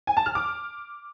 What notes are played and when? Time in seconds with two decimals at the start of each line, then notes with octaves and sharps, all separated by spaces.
0.07 G#5
0.17 A5
0.26 F6
0.35 D6